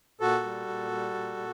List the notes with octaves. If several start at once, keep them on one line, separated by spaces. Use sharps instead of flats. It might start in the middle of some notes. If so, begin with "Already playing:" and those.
A#2 F#4 A4
G3
A#2
G3
A#2
A#2